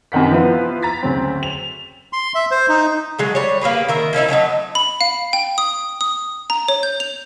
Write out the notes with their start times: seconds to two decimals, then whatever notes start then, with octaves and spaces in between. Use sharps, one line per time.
0.12 F#2 C3 D#3 F#5 B6
0.31 F3 B3 E4 F4 B4 F5
0.82 A#5 A6 B6
1.02 D2 C#3 F#3 C4
1.43 F7
2.13 C6
2.35 E5
2.51 C5
2.69 D#4
3.19 F#3 G#3 A3
3.35 G3 C#5
3.61 A#3 G4 G#4 B4
3.88 D#3 A#4 E5
4.13 A#3 C#4 D#4 E4
4.28 F#3 A3 D4 D#4
4.75 B5
5.01 F5
5.33 G5
5.58 D#6
6.01 D#6
6.50 A#5
6.68 C#5
6.83 G6
7.00 F7